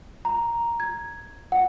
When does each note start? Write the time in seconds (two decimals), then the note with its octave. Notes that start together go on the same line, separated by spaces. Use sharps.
0.25 A#5
0.80 G#6
1.52 F#5